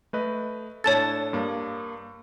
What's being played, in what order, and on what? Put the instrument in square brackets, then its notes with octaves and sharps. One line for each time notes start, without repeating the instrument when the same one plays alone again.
[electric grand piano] A3 B4 D#5
[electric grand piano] A2 D4 A4 [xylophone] C#5 A5 A6
[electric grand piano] G2 A#3